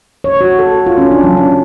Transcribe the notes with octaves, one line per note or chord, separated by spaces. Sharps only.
C#5
F#4
A4
F4
C#4
D4
F#3
C#4